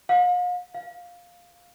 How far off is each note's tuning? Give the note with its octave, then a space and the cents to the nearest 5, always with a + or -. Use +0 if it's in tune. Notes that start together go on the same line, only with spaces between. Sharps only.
F5 +45
F5 +5